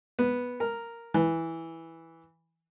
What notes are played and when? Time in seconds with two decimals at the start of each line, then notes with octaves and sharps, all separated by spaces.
0.19 B3
0.60 A#4
1.14 E3